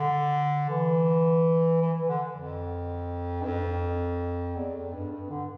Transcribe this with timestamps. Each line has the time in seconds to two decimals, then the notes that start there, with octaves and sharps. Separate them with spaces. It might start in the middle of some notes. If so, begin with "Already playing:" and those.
Already playing: D3
0.70 E3
1.81 E3
1.94 E3
2.08 D3
2.35 F2
3.42 G2
3.46 F2
4.56 E2
4.75 F2
4.93 G2
5.11 G2
5.30 D3